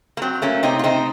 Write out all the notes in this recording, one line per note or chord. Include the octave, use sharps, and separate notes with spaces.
A#3
F#3 C4
A3 A#3 C#4
C3 C4 D#4
F4
A3 C4 D#4